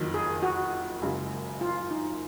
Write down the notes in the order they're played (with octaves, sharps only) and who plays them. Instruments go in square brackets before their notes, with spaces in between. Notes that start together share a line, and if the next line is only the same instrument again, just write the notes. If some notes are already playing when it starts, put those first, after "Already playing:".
Already playing: [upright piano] F#1 F2 D#3 F#3
[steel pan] G#4
F#4
[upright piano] F#1 F#2 C#3 G#3
[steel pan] F4
D#4